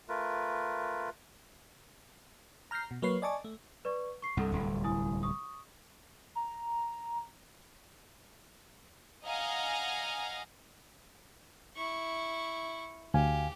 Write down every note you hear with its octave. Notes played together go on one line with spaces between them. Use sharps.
A3 F4 A#4 B4
A#5 F6 G6 A#6 C7
B2
F#3 A#3 B4 C#5 C7
D5 D#5 G#5 A5 C#6 D6
A3
B4 D5 C#6
C#6 C7
C2 G2 A4 F#5
D1 C2
E4 G#5 D#6
C#6 D#6
A#5
D#5 F5 F#5 G#5 A#5
E4 C#6
D2 G4 F5 G#5